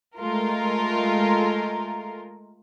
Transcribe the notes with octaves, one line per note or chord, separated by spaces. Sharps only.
G#3 A3 F4 A#4